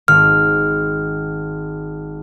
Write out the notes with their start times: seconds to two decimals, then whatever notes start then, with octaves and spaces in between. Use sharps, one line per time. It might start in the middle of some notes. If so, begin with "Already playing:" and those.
0.08 G#1 F6